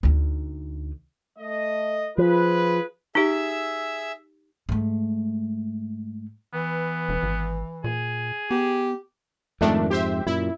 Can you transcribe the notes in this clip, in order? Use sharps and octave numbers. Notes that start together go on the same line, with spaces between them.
D2 D#4
A3 D#5
F3 F4 G#4 B4
D#4 G4 G#4 E5 E6
G#2 A3
E3 B3
E1
G#1
A#2 G#4
B3 G4
F2 G#2 D#3 A3 D4
G4 C5 E5
F#2 A#2 E4